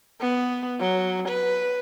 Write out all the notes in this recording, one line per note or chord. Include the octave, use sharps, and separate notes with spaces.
B3
F#3
B4